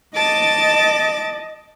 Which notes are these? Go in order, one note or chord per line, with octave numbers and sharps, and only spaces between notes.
D#5 A5 D6 A6